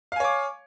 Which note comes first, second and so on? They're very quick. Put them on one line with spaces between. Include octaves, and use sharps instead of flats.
F5 G#5 C#5 D6